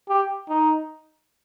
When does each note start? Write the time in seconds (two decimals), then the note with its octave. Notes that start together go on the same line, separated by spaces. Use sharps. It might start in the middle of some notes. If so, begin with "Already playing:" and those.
0.09 G4
0.49 D#4